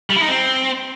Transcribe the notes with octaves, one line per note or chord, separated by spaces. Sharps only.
G3
E4
D#4
C4